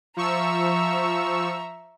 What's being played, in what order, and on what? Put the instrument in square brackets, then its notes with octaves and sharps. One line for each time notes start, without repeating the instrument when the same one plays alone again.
[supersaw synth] F3 C#6 E6 [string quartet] E5 A#5